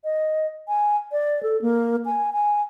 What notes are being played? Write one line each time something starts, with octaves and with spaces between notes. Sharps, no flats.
D#5
G#5
D5
A4
A#3
G#5
G#5